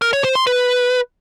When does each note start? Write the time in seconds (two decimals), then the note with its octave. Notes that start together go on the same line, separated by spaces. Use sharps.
0.02 A#4
0.13 C#5
0.24 C5
0.35 C6
0.47 B4